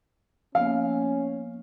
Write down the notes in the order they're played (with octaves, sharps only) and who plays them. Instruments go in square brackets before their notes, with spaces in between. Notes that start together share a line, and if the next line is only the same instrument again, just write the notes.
[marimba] F3 A#3 B3 [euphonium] C#4 [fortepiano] F5